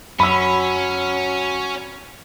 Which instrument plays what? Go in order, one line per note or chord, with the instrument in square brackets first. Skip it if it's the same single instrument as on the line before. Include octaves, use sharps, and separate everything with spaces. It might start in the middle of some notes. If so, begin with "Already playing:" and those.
[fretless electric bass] F#2 [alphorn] F#3 [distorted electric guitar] C#4 [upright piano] B5 E6